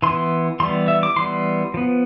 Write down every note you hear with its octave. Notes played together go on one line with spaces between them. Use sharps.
E3 B3 C6
E3 G3 B3 C6
E5
D6
E3 G3 B3 C6
F3 B3